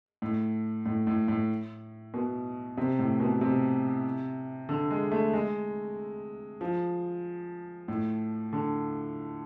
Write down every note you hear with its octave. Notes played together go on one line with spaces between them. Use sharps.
A2
A2
A2
A2
B2
C3
A2
B2
C3
D3
G#3
A3
G#3
F3
A2
D3